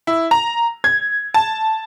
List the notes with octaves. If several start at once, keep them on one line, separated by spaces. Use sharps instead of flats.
E4
A#5
G#6
A5